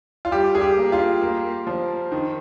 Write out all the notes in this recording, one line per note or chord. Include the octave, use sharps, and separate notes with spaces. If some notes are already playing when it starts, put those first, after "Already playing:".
F4
G3 G4
G#4
G4
A#3
F4
A#3
F3
D#3